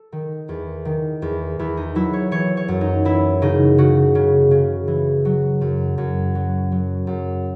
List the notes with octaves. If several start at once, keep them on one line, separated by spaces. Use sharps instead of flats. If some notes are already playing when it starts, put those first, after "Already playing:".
Already playing: A4
D#3
E2
D#3
E2
E2 E4
D#4
F#3 E4
C#5
E3 C#5
C#5
F#2
D#4
E3 E4
C#3 D#4
C#3 F#4
C#3
C#3
E3
F#3
F#2
F#2
F#3
F#3
F#2